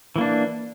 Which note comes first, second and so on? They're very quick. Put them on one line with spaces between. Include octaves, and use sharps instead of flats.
E3 A#3 D4